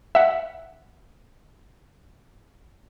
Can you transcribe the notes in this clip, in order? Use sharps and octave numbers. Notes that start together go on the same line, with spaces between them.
E5 F#5